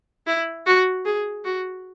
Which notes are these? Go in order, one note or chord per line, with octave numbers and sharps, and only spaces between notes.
E4
F#4
G#4
F#4